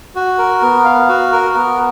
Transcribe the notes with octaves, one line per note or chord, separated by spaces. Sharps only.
F#4
A#4
B3
F5
F#4
A#4
B3